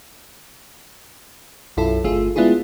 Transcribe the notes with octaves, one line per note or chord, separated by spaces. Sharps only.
B1 F#2 E4 F4 A4
G1 A3 F4 G#4
G#3 B3 D4 E4 F4 G#4